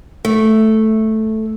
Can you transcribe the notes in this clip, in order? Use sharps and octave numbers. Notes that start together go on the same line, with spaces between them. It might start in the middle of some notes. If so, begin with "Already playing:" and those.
A3